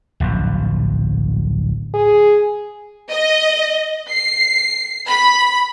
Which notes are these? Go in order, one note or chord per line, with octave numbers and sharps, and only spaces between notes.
D1 A#1 F#2
G#4
D#5
C7
B5